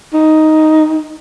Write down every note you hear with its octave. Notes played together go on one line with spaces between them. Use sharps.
D#4